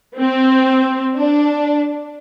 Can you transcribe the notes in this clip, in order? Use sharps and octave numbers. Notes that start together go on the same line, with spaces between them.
C4
D4